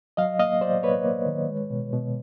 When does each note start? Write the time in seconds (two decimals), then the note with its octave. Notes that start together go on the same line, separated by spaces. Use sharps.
0.17 F#3 D#5 F5
0.39 A#3 D#5 F5
0.61 F#3 C5 D5
0.83 A#3 B4 C#5
1.04 A#3
1.26 D#3
1.49 G#3
1.70 B2
1.92 B2